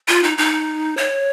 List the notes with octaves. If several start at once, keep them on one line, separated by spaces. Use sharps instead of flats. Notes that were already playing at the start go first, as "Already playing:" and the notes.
F4
D#4
D#4
C#5